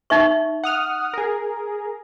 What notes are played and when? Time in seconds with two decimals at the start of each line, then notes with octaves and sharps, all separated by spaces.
0.10 D#4 E5 C#6
0.64 F#5 D#6 F6
1.14 G#4 A#4